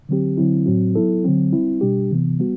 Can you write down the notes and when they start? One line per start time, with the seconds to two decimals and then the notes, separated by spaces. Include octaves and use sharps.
0.09 D3 F#3 C4 G4
0.38 D3 F#3 C4 E4
0.66 A2 F#3 C4 F#4
0.95 F#3 B3 E4 A4
1.25 D3 F#3 C4
1.52 G3 C4 E4
1.81 B2 G3 D4 G4
2.11 C3 E3 B3
2.40 G3 B3 F#4